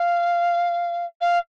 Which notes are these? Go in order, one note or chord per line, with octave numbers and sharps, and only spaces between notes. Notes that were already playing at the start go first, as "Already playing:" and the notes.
Already playing: F5
F5